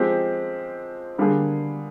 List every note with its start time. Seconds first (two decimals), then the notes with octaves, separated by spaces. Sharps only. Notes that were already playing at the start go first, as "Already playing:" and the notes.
Already playing: F3 G#3 C4 G4
1.18 D3 G3 A#3 D4 G#4